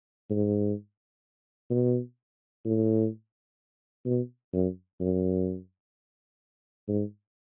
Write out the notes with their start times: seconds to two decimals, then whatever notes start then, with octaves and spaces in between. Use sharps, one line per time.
0.30 G#2
1.70 B2
2.65 A2
4.05 B2
4.53 F#2
5.01 F#2
6.88 G#2